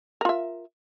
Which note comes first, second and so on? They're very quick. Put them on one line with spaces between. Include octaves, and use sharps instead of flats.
A#4 F4 E5